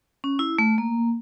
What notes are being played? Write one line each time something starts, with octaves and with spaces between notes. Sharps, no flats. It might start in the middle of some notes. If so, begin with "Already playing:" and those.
C#4
E4
A3
A#3